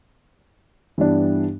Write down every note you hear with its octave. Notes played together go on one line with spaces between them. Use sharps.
G2 E3 G3 B3 D4